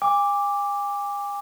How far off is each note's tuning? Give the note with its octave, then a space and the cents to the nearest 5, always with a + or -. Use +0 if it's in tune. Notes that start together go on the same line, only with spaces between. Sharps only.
G#5 -40 D6 -5